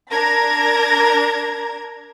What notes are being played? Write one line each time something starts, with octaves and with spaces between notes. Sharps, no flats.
D4 A#4 A#5 G#6 A#6